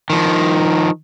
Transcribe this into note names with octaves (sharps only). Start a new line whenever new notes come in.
D#3 F3